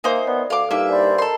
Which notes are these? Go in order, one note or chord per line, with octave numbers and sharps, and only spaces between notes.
A#3 D#4 A#4 C5 E5 G#5
B3 D5
D2 A4 F5 D6
G2 A#3 D#4 E4 E5 F6
C5 D5 G#5 B5
A4 A#4 D#5 A#5 C6